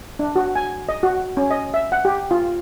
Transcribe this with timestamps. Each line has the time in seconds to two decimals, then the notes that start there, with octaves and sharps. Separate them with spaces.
0.19 D4
0.36 F#4
0.56 G#5
0.89 D#5
1.03 F#4
1.37 C#4
1.51 D#5
1.74 E5
1.92 F#5
2.05 G4
2.31 F4